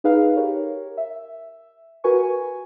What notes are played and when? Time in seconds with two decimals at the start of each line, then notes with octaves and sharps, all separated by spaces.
0.04 D#4 G#4 B4 F5
0.36 G4 A#4 C#5
0.97 E5
2.04 F#4 A#4 B4 G#5 C#6
2.23 G#5